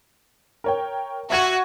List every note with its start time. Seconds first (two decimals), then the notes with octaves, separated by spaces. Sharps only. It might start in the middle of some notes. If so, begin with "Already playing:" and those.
0.64 A#4 C#5 G5
1.30 F#4 E5 G#6 D#7